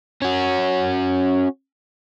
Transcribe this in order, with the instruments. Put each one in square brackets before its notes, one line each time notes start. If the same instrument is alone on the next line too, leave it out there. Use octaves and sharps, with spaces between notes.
[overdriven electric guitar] C#4 F#4